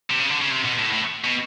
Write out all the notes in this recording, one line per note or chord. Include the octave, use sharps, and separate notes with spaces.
C3
C#3
D3
C#3
C3
B2
A2
A2
B2